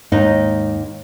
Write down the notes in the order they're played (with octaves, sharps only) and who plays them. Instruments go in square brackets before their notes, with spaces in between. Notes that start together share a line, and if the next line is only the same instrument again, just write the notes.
[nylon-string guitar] D#2 D#4 [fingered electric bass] G#2